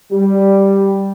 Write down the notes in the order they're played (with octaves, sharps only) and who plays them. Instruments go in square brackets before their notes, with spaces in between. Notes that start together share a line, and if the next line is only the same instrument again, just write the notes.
[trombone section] G3